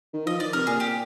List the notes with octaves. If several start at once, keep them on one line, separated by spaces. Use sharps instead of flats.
D#3
F3 D#5
D#3 D5
C3 A#4
A#2 G#4
G4